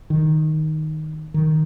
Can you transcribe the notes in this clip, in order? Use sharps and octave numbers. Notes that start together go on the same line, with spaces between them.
D#3
D#3